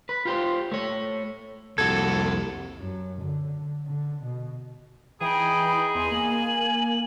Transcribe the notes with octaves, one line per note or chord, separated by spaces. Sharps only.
B4
F4 G4 C5
A3 C#5
C2 F2 A#3 F#4 A4 G#6
F#2
D3
D3
B2
E3 D#4 G#4 G5 B5
E2 G#5 C6
A#3 F#7